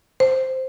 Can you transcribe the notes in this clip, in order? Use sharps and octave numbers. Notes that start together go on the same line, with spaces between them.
C5